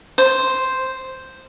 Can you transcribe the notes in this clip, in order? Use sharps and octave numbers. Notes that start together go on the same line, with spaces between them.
C5